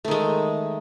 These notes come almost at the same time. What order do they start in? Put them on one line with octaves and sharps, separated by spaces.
A3 D#3 G#3